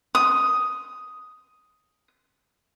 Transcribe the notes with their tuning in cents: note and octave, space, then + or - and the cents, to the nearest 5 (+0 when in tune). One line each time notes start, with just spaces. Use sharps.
D#6 +5